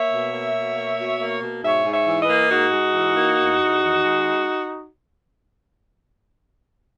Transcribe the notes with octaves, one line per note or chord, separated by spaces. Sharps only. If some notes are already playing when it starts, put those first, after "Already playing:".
Already playing: A#3 C#5 E5
B2
A#3
B2
A#3
B2
A#3
B2
G#2 C#5 E5
G#2
C#5 E5
E3
B4 D#5
A#3
G#2 D#4 F#4
G#2
E3
A#3
E2
E2
D#3
G#3